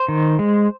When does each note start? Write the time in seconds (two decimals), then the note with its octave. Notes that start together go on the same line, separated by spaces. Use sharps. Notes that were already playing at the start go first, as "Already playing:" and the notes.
Already playing: C5
0.08 D#3
0.39 G#3